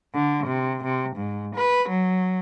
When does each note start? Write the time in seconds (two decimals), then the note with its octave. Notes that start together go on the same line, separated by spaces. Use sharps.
0.14 D3
0.47 C3
0.84 C3
1.16 G#2
1.55 B4
1.89 F#3